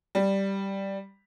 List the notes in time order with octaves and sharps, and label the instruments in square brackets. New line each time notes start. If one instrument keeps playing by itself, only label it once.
[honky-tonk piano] G3